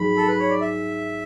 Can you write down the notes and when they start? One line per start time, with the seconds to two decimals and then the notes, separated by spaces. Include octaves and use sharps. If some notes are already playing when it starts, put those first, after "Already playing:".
Already playing: G#2 F#3 F#4 B5
0.17 A4
0.28 B4
0.39 C#5
0.49 D5
0.61 E5